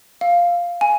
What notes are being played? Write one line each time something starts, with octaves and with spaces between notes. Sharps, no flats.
F5
G#5